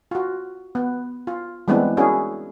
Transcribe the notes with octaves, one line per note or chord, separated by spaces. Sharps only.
F4 F#4
B3
F4
E3 G3 G#3 B3 C4 D4
C#4 D4 E4 F#4 G#4 A#4